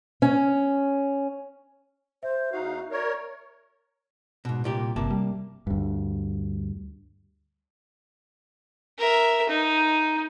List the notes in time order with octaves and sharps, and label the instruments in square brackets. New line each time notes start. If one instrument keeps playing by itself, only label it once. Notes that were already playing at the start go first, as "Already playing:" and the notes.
[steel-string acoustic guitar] C#4
[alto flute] C5 [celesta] E5
[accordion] E2 D#4 F5 [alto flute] F#4
[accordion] A#4 C#5 [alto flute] D5
[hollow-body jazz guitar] G#2 B2
C2 A#2 G4
[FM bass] G1 [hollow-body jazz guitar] C3 A#3 A5
[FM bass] G3
[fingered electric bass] D2 G2
[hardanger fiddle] A#4 E5
D#4